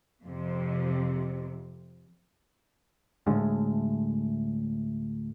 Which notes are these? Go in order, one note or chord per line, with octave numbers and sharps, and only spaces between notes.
F2 C3
D2 A2 G#3